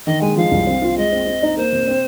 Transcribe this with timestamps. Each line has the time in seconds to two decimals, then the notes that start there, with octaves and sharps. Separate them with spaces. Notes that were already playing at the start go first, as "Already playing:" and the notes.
0.06 D#3 D#5
0.21 G#3 G#5
0.37 F3 F5
0.52 C2
0.67 C4
0.82 F4
0.97 G#3 D#5
1.12 C4
1.26 C4
1.42 D#4
1.57 A#3 C5
1.73 C3
1.88 C4